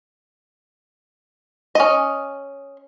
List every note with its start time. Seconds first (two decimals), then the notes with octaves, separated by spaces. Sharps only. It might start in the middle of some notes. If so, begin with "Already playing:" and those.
1.75 C#4 D#5